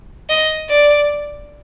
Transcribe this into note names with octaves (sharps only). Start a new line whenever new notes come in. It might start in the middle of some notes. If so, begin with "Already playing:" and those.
D#5
D5